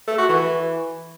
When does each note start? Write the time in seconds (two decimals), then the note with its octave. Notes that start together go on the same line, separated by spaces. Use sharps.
0.07 A3
0.18 F#4
0.29 E3